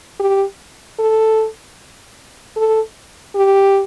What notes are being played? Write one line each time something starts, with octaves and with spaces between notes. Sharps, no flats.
G4
A4
A4
G4